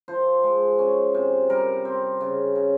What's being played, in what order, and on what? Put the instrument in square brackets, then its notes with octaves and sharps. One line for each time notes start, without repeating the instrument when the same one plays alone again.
[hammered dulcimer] F3 C5
G#3
C#4
C3
G3 A#4
C4
C#3
C#3